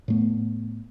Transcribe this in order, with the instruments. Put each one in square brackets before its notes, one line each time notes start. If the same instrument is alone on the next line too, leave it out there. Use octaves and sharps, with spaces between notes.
[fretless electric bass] A2 A3 B3